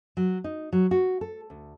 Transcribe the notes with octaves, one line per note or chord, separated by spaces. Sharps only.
F#3
D#4
F#3
F#4
A4
D2